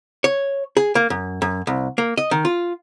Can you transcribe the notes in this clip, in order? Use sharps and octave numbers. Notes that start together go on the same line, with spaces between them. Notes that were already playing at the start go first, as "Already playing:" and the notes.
C#5
G#4
A#3
F#2
F#2
C2
A#3
D#5
D#3
F4